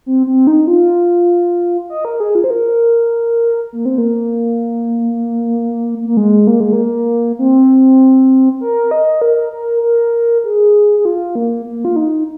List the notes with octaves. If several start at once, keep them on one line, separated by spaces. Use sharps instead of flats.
C4
C4
D#4
F4
D#5
A#4
G#4
F4
C5
A#4
A#3
C4
A#3
A#3
G#3
A#3
G#3
A#3
C4
A#4
D#5
A#4
A#4
A#4
G#4
G#4
F4
A#3
A#3
F4
D#4